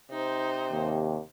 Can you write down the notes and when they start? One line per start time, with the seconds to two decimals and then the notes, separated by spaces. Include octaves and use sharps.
0.11 C3 D#4 C5
0.72 D#2